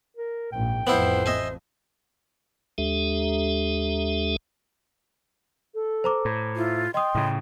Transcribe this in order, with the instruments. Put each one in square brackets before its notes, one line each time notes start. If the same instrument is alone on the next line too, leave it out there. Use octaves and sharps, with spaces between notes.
[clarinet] A#4
[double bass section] A#1 G#2 [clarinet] G5
[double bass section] A1 F2 [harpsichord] B3 E4 [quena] C5
[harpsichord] D#5 E5 G#5
[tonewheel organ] D#2 G#3 D4 G4 A4 E5
[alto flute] A4
[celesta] C5 A#5 D6
[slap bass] A2
[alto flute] E4 [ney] F4
[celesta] D#5 D#6 [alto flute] G5 [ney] C6
[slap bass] A2 C#3